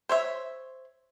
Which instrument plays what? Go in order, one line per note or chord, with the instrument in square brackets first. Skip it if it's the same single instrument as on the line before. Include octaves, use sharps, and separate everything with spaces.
[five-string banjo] C5 C#5 E5